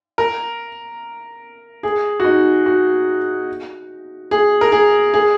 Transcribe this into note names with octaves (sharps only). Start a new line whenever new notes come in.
A#4
G#4
F#4
D#4
F#4
G#4
A#4
G#4
G#4